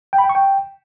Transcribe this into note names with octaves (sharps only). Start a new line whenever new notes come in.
G5
B5
G5
C#6
G5